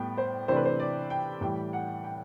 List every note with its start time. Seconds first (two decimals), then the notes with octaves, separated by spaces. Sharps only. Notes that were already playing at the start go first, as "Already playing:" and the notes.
Already playing: A2 G3 B3 G5
0.17 C5
0.48 C3 E3 A3 D4 C5
0.56 B4
0.65 C5
0.80 D5
1.10 G5
1.41 A2 E3 G3 G5
1.73 F#5
2.04 G5